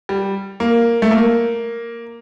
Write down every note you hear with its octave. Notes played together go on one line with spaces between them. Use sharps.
G3
A#3
A3
A#3